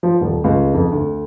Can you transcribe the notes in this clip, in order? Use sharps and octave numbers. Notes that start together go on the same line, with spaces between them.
F3
D#1
C#2
F2
D2